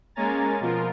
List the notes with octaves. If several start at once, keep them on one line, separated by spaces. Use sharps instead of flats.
G#3 A#3 C#4 G#5 A#5 A6
B2 F3 F4 A#4